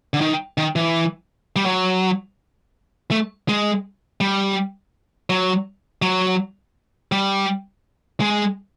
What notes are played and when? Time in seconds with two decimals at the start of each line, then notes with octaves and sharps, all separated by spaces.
0.14 D3
0.21 D#3
0.58 D#3
0.76 E3
1.56 G3
1.66 F#3
3.11 A3
3.49 G#3
4.21 G3
5.30 F#3
6.02 F#3
7.12 G3
8.21 G#3